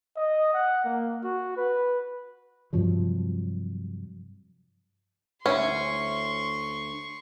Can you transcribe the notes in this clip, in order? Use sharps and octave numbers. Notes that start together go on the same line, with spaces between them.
D#5
F#5
A#3
F#4
B4
G2 C3 F3 F#3
D2 C#4 E4 C6 C#6